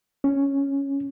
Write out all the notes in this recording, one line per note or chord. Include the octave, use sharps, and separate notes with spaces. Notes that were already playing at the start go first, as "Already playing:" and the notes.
C#4